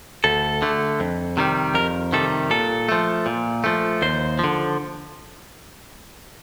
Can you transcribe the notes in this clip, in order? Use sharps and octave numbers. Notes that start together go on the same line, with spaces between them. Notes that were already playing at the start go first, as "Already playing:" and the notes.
D2 A4
D3 A3
F2
C3 D#3 G3
F2 A#4
C3 D#3 G3 A4
A#2 A4
F3 A3
A#2
F3 A3
D#2 C5
D3 F3